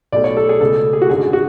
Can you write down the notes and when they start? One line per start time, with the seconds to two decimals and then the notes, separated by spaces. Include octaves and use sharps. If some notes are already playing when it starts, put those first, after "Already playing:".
0.12 B1 B2 A3 D5
0.24 C#5
0.37 A4
0.49 G#4
0.61 C#2 B2 A3 A4
0.93 G#4
1.02 F#4
1.09 G#1 F#2 D3 F#3 G#4
1.33 F#4